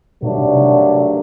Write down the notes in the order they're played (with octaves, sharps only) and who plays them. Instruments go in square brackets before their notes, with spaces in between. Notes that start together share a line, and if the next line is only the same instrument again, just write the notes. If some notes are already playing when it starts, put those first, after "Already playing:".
[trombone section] G2 D#3 F#3 A3 D4 [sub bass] B2
[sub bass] C3